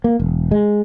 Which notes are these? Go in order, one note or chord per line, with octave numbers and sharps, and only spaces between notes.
A#3
E1
G#3